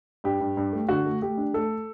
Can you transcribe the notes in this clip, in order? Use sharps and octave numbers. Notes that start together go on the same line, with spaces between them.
G2 G4
G2
G2
A3
D3 F#4
A3
A3 G4
D4
A3 A4